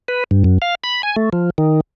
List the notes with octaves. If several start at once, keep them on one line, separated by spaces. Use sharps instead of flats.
B4
G2
F#2
F5
B5
G#5
A3
F3
D#3